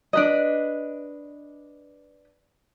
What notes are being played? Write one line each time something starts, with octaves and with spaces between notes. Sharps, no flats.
D4 B4 D#5